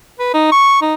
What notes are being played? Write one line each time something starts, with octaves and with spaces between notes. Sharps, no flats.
B4
D#4
C#6
D#4